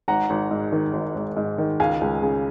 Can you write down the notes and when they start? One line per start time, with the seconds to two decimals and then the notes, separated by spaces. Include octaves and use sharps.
0.08 G#1 F#5 A#5
0.30 G#1
0.51 G#2
0.72 D#3
0.93 G#1
1.15 G#1
1.37 G#2
1.58 D#3
1.80 C#2 F5 G#5
2.01 C#2
2.22 C#3